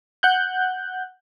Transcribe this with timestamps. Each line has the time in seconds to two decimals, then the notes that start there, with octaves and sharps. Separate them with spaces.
0.23 F#5 F#6 G6